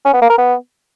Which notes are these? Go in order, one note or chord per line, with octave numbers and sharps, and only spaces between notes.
C#4
B3
A#3
A#4
B3